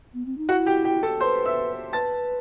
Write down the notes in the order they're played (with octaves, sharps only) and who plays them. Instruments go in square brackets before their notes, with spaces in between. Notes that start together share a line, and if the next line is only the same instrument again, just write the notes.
[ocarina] B3
C4
D#4
[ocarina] E4 [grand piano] F#4 F#5
[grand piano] G4 G5
G4 G5
A4 A5
[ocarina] B4 [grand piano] C5 C6
[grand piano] E5 E6
[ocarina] B4 [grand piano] A5 A6